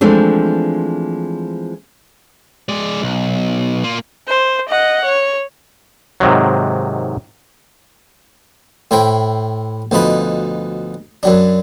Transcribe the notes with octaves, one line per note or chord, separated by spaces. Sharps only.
E3 F3 G#3 A3 C4 D4
G#3 D5
B1
A#3 F4
C5
D#5 F#5
C#5
G#2 C3 D#3 F#3
A2 E4 C5 G5
D2 B2 F3 D#4 B5
F#2 F#3 D4